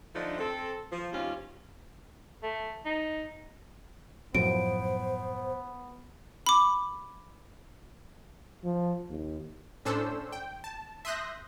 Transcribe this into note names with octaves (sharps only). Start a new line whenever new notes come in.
D3 F3 A3 D4 D#4
C4 A4
F3
D#2 G3 C4 C#4 F4
A3
D#4
F#2 A2 F3 B3 C5 D7
B5 D6
F3
D#2
A2 C#4 D4 A4 C5 E6
G5
A5
E5 C6 D#6 F#6 G6 A#6